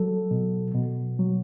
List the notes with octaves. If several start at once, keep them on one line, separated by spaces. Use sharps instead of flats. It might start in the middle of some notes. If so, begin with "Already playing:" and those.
Already playing: F#3 A4
B2
B2
F#3